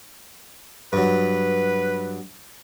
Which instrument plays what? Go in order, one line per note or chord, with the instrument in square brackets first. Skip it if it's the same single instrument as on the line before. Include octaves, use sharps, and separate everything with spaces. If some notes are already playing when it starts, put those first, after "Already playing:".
[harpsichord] G2 F#3 [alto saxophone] B4